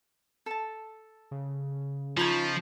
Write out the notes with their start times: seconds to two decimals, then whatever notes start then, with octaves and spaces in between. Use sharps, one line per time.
0.46 A4 A5
1.31 C#3
2.17 F3 D#4 F4 B5 C#6 G#6